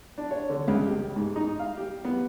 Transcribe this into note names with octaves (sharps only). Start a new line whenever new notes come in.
D4
C#5
D3
C#2
G4
G#2
D#4
F5
G4
B3